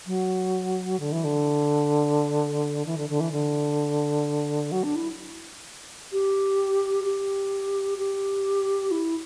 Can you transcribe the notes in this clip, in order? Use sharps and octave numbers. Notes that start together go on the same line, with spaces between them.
F#3
D3
E3
D3
E3
D3
D3
E3
D3
F#3
D4
E4
G4
G4
G4
E4